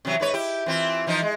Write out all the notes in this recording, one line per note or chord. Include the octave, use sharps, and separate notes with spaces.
C3 E3 F#3
G#2 B4 C#5
E4 G4
E3 C4 F4
E3 F3 D#4
G#3